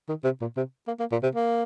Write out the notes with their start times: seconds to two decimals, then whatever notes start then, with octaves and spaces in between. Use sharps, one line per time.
0.09 D#3
0.24 C3
0.41 A#2
0.57 C3
0.88 A#3
1.00 A#3
1.12 A#2
1.23 C3
1.35 A#3